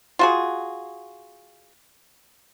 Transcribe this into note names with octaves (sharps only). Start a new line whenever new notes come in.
F4 F#4 G#4